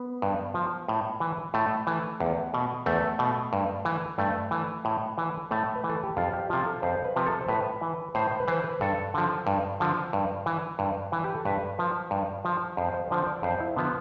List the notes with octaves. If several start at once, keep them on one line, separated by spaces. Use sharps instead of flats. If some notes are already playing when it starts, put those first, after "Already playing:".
Already playing: B3
G2
F3
A2
E3
A2 A3
E3
E2
B2
E2 A3
B2
G2
E3
G2 A3
E3
A2
E3
A2 A3
B4
E3
A4
G4
F2 F4
G4
C3 F3 F4
A4
F2 C5
B4
C3 F3
A4
C5
A2 B4
E3
A2 C5
C5
B4
E3 C5
B4
G2 A4
D3 F3
G2
D3 F3
G2
E3
G2
E3
G4
A4
G2 B4
F3
G2
F3
F2 C5
C5
D3 F3 C5
D5
F2 C5
E4
D3 F3 B3